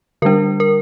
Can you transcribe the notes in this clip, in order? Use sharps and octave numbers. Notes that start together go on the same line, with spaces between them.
D3 G3 D4 A#4
A#4